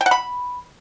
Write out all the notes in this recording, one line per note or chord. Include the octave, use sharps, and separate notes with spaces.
G5
F#5
B5